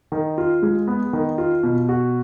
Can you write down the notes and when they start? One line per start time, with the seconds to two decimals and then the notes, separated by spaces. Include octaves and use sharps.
0.12 D#3
0.38 F4
0.62 G#3
0.87 B3
1.13 D#3
1.38 F4
1.63 B2
1.89 F#4